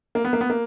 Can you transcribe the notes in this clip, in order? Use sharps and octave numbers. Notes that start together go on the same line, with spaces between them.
A#3
B3
A#3
B3
A#3